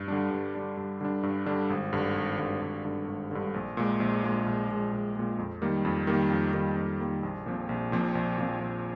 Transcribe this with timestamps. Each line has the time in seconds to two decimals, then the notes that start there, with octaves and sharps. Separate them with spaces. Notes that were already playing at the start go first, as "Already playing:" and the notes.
Already playing: G2
0.08 D3 G3 D4
0.31 G2
0.55 D3 G3 D4
0.77 G2
1.01 D3 G3 D4
1.23 G2
1.46 D3 G3 D4
1.70 G#1
1.93 G2 D3
2.16 G#1
2.38 G2 D3
2.62 G#1
2.85 G2 D3
3.08 G#1
3.31 G2 D3
3.54 A#1
3.77 A#2 G#3
4.00 A#1
4.23 A#2 G#3
4.46 A#1
4.69 A#2 G#3
4.93 A#1
5.16 A#2 G#3
5.38 F2
5.62 D#3 G3 A#3
5.85 F2
6.07 D#3 G3 A#3
6.31 F2
6.54 D#3 G3 A#3
6.77 F2
7.00 D#3 G3 A#3
7.23 A#1
7.46 A#2 F3 C4
7.69 A#1
7.92 A#2 F3 C4
8.15 A#1
8.38 A#2 F3 C4
8.61 A#1